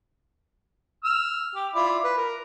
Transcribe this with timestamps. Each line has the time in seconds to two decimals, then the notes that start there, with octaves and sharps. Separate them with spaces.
1.04 E6 F6
1.55 G4
1.75 E4 F4 D5
2.04 B4
2.18 A#4